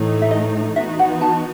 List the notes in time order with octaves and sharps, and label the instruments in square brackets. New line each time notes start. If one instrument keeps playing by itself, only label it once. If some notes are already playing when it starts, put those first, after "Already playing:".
Already playing: [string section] A2 E3 A3 D#4
[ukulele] E5
D#5
[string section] E3 B3 D#4 F#4 [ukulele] E5
[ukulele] F#5
A5